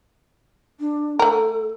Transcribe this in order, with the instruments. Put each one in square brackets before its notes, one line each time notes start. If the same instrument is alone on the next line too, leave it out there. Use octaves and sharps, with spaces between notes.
[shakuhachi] D4
[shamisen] A3 A#4 [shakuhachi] A4